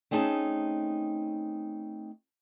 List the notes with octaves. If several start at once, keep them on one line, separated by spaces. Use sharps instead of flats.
A3 C4 C#4 D#4 G#4 A5